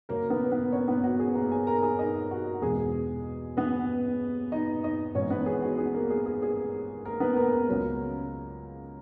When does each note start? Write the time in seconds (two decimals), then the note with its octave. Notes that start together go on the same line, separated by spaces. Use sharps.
0.09 F#2 C#3 F#3 A#3 A#4
0.30 B3 B4
0.51 B3 B4
0.72 C#4 C#5
0.88 B3 B4
1.04 F#4
1.20 G#4
1.35 A#3 A#4
1.51 G#4 G#5
1.67 A#4 A#5
1.82 G#4 G#5
1.99 D#4 D#5
2.31 F#4
2.62 E2 B2 G#3 G#4
3.57 B3 B4
4.52 D#4 D#5
4.83 D#4 D#5
5.15 G#1 G#2 E3 B3 C#4 D#4 C#5
5.30 B3 B4
5.46 G#4
5.62 F#4
5.78 G#4
5.94 A#3 A#4
6.10 G#4
6.26 G#4
6.42 G#4
7.05 A#3 A#4
7.20 B3 B4
7.36 A#3 A#4
7.52 A#3 A#4
7.68 C#2 C#3 F#3 C#4